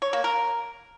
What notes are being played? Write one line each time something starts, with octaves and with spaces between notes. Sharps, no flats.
C#5
A#3
A#4